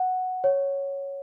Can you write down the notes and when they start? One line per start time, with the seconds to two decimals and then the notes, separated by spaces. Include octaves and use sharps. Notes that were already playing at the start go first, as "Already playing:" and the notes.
Already playing: F#5
0.44 C#5